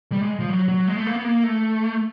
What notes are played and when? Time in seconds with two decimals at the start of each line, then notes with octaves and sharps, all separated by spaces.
0.12 G3
0.21 G#3
0.40 F3
0.49 F#3
0.69 F#3
0.87 G#3
0.96 A3
1.06 A#3
1.16 B3
1.25 A#3
1.43 A3